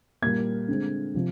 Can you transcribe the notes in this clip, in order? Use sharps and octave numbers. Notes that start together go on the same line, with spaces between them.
A#2 G3 A#3 G#6
D3 G#3 C4
C3 F3